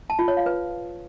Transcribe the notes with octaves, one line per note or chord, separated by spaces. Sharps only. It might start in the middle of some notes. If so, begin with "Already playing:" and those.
A5
F4
C#5
F5
B4